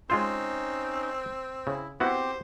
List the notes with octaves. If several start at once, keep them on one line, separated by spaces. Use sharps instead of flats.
G#3 C4 C#4 D#4 F4 C5
C#3 E4
B3 C4 E4 F#4 G4 C5